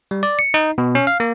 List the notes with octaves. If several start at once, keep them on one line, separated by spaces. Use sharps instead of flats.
G3
D5
C#7
D#4
B2
C#4
F5
A#3